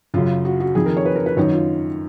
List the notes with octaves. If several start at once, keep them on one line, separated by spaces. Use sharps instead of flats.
F#2 C#3 F4
F#4
F#4
F2 D#3 G#4
A#4
C#5
B4
A#4
B4
F#2 D#3 C#5
F4